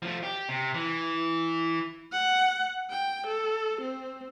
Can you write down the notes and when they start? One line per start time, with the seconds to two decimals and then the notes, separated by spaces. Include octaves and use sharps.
0.02 F3 A3
0.23 G4
0.49 C3
0.74 E3
2.12 F#5
2.91 G5
3.27 A4
3.81 C4